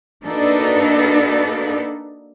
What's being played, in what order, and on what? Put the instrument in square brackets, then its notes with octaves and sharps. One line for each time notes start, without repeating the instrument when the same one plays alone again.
[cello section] A#3 D4 D#4 F#4 A4 B4